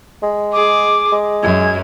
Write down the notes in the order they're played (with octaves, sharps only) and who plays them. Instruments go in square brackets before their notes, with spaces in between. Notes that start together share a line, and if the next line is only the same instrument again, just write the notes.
[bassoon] G#3
[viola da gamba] G#4 [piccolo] D6
[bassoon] G#3
[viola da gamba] F#2 [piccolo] G#6